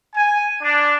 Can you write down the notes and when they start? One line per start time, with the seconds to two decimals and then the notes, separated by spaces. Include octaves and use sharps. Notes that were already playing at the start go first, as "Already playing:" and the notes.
0.16 G#5
0.62 D4